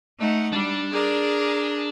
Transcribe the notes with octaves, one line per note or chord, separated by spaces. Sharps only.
A3 D#4 F#5
G3 D4
G#4 A#4 D5